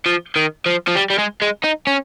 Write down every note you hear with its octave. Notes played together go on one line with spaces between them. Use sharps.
F3
D#3
F3
F3
G3
G3
G#3
G#3
D#4
C#4